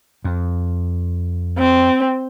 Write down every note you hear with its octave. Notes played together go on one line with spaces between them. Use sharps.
F2
C4